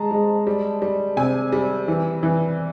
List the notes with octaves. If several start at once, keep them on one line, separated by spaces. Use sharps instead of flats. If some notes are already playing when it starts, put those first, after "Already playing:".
Already playing: G#3 A5 A#5
G#3
G3
G3
C3 G#5
G3
E3
E3